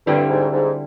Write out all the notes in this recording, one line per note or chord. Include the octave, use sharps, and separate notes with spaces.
G2 D3 G3 C4 E4
G#2
G#2